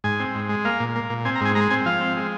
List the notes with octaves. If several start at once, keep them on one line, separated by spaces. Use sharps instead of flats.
G#2 G#5
C4
G#2
G#3
A#3 F5
A#2
A#3
A#2
C4 G#5
A#5
G#2 G#5
G#3 A#5
C4 G#5
F3 F5
C4
G#3